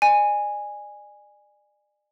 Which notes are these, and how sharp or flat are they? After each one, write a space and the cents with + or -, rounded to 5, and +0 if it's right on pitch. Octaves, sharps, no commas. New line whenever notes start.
D5 +35 G#5 -10